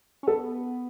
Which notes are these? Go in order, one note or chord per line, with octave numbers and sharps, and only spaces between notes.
C#4
B3 A4